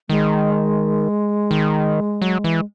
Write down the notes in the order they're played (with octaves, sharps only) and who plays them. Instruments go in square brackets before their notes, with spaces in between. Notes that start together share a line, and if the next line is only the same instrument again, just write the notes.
[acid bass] D#3 [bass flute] G#3
[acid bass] D#3
F#3
E3